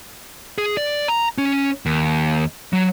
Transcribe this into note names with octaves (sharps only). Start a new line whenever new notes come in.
G#4
D5
A#5
C#4
D#2
F#3